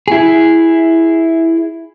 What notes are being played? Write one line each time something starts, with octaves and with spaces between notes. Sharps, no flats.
E4 G#4